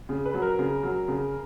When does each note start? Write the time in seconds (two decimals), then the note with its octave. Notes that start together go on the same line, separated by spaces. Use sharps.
0.09 C#3
0.26 B4
0.34 F#3
0.42 A#4
0.59 C#3
0.83 F#3
1.08 C#3